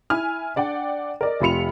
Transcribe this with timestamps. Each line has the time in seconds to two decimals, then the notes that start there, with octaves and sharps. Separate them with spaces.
0.10 E4 G#5 F6
0.56 D4 D5 F#5 G5
1.21 A#4 D5 D#5
1.40 F1 C3 F4 B5 C#7 F7